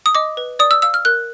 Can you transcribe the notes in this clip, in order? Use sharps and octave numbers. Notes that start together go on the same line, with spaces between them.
D#6
D#5 D6
B4
D5 D#6
E6
F5 E6
F6
A#4 F#6